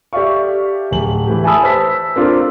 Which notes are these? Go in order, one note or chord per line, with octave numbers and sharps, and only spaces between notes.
G4 A4 D5 E5 F5 C#6
D1 F#7
E3 A3 G4
E5 G#5 A5 B5 D#6 E6
B4 C5 A5 E6 B6
C4 D4 F4 A4 A#4